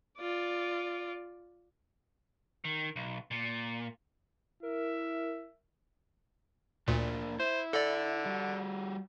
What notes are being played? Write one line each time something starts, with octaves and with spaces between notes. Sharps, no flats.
F4 D5
D#3
B1
A#2
E4 A#4 E5
D2 A#2 A#3 D4
E4 C5
D3 A4 D5
G3 F#4